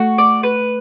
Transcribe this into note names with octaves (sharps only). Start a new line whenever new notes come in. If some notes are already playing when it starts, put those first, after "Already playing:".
Already playing: A3 F#4
D5
B4